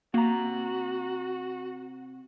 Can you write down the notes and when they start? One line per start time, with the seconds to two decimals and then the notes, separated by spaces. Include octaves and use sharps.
0.14 C3 A#3 F#4 A#5